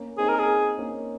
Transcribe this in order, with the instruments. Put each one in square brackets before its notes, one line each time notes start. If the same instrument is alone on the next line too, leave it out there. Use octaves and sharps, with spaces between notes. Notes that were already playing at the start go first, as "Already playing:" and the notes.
Already playing: [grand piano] A#3 C#4
[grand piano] C4 D#4 [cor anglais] G#4
[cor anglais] A#4
G#4
[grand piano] A#3 C#4